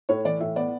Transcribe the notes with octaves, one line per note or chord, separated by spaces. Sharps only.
A2 C#5
E3 D5
A2 E5
B3 D5